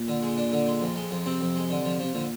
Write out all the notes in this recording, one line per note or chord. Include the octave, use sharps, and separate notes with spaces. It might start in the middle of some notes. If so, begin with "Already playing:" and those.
Already playing: A#2
D3
G#3
D4
D3
G#3
F2
G#3
F2
C3 C4
F2
G#3
D3
F3
C3 F3
A#2 D3